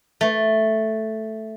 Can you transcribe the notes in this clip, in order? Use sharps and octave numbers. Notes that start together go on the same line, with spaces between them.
A3